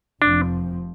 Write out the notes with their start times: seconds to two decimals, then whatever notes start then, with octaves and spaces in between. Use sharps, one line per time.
0.22 F1 F2 F3 C4 D4